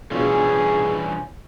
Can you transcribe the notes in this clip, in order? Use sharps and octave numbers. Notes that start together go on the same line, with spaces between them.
B2 E3 G3 C#4 D4 F4 G#4